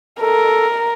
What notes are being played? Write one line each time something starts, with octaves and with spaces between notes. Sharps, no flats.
A4 A#4